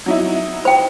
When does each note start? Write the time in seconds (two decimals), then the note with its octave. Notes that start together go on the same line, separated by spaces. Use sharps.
0.06 F#3 D#4 E4
0.65 C5 G5